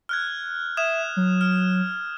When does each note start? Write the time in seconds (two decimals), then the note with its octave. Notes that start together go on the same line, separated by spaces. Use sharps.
0.09 F6 F#6 G#6
0.77 E5 D#6 G#6 E7
1.17 F#3
1.41 F6